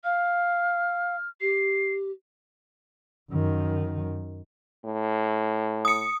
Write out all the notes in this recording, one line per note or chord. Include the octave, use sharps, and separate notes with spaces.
F5 F6
G4 C7
F#2 D#3
A2
D#6 C#7